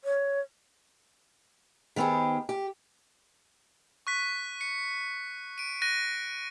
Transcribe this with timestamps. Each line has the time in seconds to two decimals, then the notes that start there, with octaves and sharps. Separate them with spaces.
0.04 C#5
1.96 D#3 B3 C4 G4 G#4
2.49 G4
4.07 C#6 F#6 B6
4.61 C#7
5.58 D7 D#7
5.82 F#6 A#6 D#7